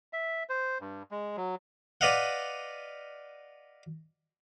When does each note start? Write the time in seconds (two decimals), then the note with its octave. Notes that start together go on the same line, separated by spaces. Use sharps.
0.13 E5
0.49 C5
0.81 G2
1.11 G#3
1.37 F#3
2.01 B4 D5 D#5 F5 F#5